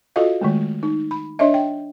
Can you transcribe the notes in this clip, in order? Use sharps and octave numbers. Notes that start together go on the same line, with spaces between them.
F4 F#4 A4 D#5 F5
D#3 G#3 A3
D#4
B5
D4 C#5 D#5 E5
G5